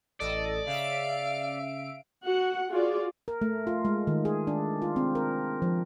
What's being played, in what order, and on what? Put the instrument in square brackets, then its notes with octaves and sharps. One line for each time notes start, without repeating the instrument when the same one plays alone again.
[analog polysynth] A1 A4 D#5 [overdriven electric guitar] D5
[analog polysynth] C#3 E5 D7 [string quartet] F5
[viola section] F#4 F#5
F4 F#4 G#4 D5
[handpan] A#4
A3
F4
G#3
D#3
G#4
D4
F4
C4
A#4
F3